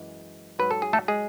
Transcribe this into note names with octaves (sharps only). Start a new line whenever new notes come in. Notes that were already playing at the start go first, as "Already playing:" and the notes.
Already playing: F#2 E3 G#3
G#2 F#3 B4
A4
G#4
A3 A4
G#3 G#4